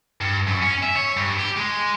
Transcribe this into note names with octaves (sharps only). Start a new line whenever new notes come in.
G2
F#2
C#4
E5
C#5
G2
G4
G#3